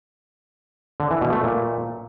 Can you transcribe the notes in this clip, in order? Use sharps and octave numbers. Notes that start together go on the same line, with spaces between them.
D3
E3
B2
A3
A#2